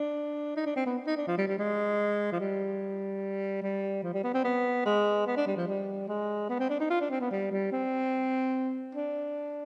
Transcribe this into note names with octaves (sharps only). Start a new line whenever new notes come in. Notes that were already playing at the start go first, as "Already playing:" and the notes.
Already playing: D4
D#4
D4
C4
B3
D#4
D4
F3
G3
G3
G#3
F3
G3
G3
F3
G3
B3
C4
B3
G#3
B3
D4
G3
F3
G3
G#3
B3
C4
D4
D#4
F4
D4
C4
B3
G3
G3
C4
D4